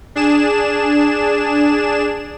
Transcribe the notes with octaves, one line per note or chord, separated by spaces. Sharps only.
D4 G#4 E7